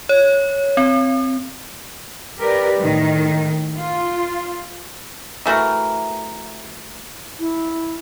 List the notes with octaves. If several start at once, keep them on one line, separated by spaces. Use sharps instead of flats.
C#5
C4
G4 A#4 B4 D5
A2 D#3
F4
E3 A3 F#4 A#4
E4